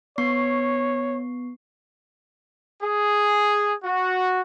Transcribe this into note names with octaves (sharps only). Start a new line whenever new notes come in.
B3 C#5 C#6 C7
G#4
F#4